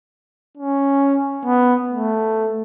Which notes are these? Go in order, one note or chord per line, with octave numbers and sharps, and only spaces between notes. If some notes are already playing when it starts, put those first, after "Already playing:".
C#4
B3
A3